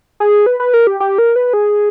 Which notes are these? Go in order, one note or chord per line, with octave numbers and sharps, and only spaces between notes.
G#4
B4
B4
A#4
G4
G4
A#4
B4
G#4